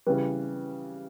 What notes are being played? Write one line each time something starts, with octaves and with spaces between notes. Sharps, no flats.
C#3 E3 G3 B4